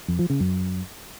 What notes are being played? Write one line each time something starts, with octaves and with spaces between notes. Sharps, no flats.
F2
F3
C#3
F#2